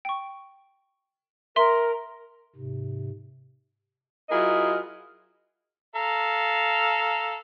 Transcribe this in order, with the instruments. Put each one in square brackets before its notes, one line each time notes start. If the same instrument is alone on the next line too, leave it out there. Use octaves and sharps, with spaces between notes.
[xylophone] G5 C#6
[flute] A#4 [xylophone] E5 C6
[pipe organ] G#2 C3
[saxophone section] F#3 E4 F4 G#4 A#4 D#5
[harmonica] A4 F5 A#5